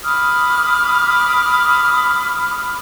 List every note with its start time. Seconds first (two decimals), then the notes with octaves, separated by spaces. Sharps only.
0.04 B5 D6 D#6 F6